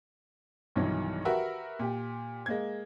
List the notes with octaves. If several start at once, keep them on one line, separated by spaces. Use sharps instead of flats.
B1 G2 D#3 E3 F#3
F#4 G4 A#4 B4 E5 F#5
A#2 G4
G#3 A#3 G#6